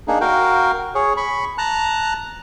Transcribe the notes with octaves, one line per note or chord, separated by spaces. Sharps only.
A#3 D4 D#4 G#4
F#4 A#4 F5 G5
G#4 C#5
B5 C#6
A5 A#5 F#6